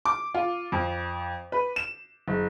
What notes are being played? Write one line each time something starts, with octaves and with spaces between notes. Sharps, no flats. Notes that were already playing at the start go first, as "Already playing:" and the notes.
D6
F4
F2
B4
E7
F#1